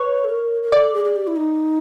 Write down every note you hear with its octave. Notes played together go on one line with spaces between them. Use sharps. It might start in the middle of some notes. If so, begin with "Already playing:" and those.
Already playing: B4 C#5
A4
A#4
A#4
A4 D5
G#4
G#4
G4
E4
D#4